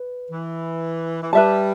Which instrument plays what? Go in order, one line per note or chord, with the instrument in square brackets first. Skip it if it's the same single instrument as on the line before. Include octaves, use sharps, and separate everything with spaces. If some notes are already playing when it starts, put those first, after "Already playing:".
Already playing: [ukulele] B4
[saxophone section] E3
E3
[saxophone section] G3 [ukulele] B4 E5 A5